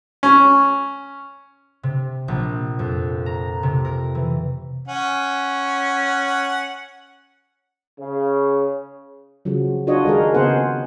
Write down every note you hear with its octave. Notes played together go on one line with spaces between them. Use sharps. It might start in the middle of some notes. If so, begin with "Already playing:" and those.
C#4
C3
A#1
F2
A#5
C3
A#4
E3
C#4 F#5
C#3
C#3 F3 F#3
D4 F4 F#4 C#5 D#5
D#3 G#3 G#4 A#4
C#3 B3 C4 G#4 C5 F#5